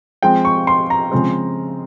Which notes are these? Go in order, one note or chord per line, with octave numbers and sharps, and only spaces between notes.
F3 G#3 C4 G5
C#6
C6
A#5
C#3 F3 G#3 C4